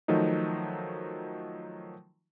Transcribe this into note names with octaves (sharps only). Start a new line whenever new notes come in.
D#3 F3 F#3 A3 D#4